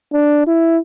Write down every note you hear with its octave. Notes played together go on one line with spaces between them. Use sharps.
D4
E4